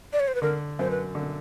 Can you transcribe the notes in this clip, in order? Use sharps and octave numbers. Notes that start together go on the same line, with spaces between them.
D5
C#5
C5
B4
D3 A#4
F#2 C5
B4
D3